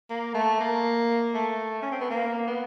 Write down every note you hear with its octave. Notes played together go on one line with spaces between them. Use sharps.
A#3
A3
A#3
A3
C#4
C4
B3
A#3
B3